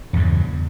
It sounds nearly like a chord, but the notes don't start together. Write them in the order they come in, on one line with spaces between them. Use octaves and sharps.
E2 G2 C#3